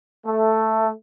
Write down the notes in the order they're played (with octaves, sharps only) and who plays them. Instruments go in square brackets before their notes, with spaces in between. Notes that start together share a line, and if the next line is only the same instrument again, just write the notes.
[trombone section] A3